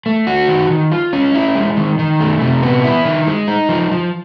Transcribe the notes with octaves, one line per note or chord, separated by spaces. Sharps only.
A3
F#4
D#3
D#3
F4
C#4
E4
G#3
D#3
D#3
A3
C3
B3
E4
D#3
G#3
D#4
F3
F3